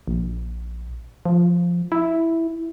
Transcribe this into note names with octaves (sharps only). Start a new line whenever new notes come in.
A#1
F3
E4